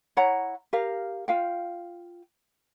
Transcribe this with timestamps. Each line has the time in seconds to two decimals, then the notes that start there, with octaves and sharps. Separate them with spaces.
0.17 E4 C#5 F#5 A#5
0.73 G4 A#4 F5
1.28 F4 F5 G5